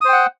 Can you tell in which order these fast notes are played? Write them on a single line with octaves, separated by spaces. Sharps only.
D#6 C5 G5 F#5